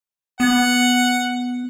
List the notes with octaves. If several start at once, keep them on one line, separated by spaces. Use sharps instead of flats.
B3 F#5